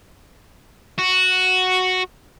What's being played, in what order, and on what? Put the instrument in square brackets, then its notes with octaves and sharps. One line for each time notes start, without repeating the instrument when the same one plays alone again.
[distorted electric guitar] F#4